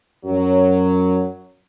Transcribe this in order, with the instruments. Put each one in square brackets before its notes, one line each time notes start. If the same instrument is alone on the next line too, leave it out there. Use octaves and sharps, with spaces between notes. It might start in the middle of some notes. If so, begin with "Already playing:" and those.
[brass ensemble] F#2 F#3